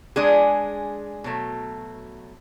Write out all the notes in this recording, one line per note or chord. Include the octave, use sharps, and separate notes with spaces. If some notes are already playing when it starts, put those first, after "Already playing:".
G#3 D4 G#4
B2 F#3 A3